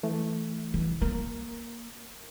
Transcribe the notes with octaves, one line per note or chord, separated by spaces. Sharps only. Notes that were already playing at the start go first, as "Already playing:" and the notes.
E3 A3
E2 E3
A#3 A#4